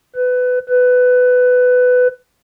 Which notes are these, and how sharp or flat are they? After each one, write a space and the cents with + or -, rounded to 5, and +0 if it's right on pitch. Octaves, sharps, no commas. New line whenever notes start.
B4 +20
B4 +15